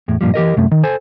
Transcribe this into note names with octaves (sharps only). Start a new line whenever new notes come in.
E2 A2
G2 A#2 F3 G3
E3 G4 A#4 D#5
C2 F#2 A3
D#3
A4 C5 G#5